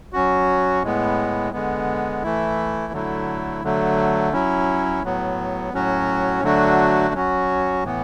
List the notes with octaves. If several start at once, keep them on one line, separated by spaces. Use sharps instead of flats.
F#3 C#4 F#4
A2 G#3 B3
D3 G#3 B3
E3 A3 E4
D3 F#3 A3 E4
D3 F#3 A3
F#3 C#4 E4
A2 F#3 B3
A2 F#3 C#4 F#4
D3 F#3 A3 D4 F#4
F#3 C#4 F#4
A2 E3 B3